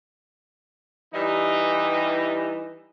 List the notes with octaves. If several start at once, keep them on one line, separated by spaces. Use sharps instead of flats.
E3 G3 D#4